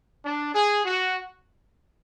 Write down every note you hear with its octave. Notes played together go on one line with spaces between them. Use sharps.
D4
G#4
F#4